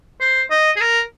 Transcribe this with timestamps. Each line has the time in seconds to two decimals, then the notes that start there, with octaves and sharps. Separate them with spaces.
0.21 C5
0.50 D#5
0.76 G#4
0.80 A#4